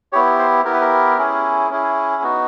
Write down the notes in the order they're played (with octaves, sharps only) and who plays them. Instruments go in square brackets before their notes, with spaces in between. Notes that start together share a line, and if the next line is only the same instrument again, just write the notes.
[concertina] B3 E4 G4 C#5
C5
B3 E4 G4 A#4
B4
A#4
C#4 E4 G#4
C#4 E4 G#4
B3 D#4 F#4